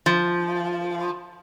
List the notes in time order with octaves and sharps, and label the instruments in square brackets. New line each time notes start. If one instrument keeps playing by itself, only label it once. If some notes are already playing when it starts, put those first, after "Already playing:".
[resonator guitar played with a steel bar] F3